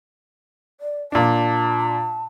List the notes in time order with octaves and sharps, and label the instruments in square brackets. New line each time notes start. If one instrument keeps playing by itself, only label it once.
[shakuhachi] D5
[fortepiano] A#2 D4 [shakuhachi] A5